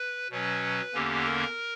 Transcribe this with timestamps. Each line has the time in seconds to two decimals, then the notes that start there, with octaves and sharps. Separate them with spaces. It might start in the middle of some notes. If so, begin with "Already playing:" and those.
Already playing: B4
0.31 B2 F#3 C#4 B4
0.93 E2 D3 A#3 C#4 G4
1.25 A#4